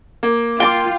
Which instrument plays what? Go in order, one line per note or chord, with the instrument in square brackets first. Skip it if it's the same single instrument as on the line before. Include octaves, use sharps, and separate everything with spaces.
[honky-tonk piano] A#3
[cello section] F4 [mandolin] G5 A5 D6